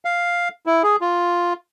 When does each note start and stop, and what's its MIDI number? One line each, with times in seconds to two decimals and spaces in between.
0.05 0.49 77
0.66 0.83 64
0.83 0.96 68
1.01 1.53 65